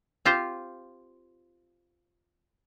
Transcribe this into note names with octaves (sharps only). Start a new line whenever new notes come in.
C4 F4 G4 C5